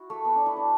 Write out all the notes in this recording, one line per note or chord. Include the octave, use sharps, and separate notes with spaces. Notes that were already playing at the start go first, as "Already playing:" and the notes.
Already playing: E4 F#4
A3
B3
D4
E4
D4